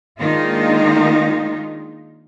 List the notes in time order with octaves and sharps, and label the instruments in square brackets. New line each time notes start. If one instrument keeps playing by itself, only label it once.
[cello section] D#3 G#3 A#3 D4 D#4 F4